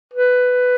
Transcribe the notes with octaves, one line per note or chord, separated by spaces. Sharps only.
B4